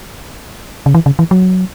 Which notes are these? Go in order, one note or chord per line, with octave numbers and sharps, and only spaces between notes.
C#3
E3
C#3
E3
F#3